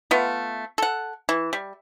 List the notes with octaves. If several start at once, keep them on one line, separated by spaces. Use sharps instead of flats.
A3 B3 F4
A4 F#5
E3
G3